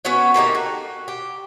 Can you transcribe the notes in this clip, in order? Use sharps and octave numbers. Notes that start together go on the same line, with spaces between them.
B3 C#4 F#4 C#5
A3 A#3 D#4 G4
F#4
G4